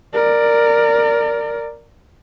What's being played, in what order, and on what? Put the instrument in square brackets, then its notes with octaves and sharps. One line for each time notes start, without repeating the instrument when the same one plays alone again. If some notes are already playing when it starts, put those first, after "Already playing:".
[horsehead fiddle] A#4 D5